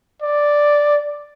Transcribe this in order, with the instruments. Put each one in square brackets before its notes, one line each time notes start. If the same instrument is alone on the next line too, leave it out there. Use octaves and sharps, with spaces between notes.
[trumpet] D5